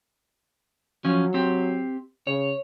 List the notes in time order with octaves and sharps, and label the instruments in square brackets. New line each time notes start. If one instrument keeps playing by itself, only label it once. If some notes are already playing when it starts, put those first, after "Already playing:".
[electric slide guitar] F3 C#4 [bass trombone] F#3
[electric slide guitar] C4 G4
[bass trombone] C#3 [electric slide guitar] C#5